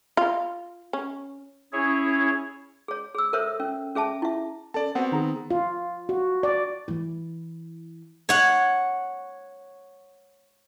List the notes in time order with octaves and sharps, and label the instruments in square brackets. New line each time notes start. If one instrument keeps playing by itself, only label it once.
[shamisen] F4
C#4
[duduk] C#4 [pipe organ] E4 G#4 C#5
[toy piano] G#4 C#5
G#4 E6
A4 A#4 C5 C#5 E5
C#4
C#4 G#4 E5 A5
E4 E5
[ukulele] C#4 A4 [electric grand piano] D5 A5
[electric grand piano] B3 C4 [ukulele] F#4 C5 F#5
[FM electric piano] D#3 [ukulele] G#4 A#5
[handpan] F4
F#4
D5
[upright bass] E3 E4
[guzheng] C#5 F#5